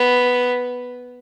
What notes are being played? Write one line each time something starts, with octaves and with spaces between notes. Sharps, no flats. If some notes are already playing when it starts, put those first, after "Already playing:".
Already playing: B3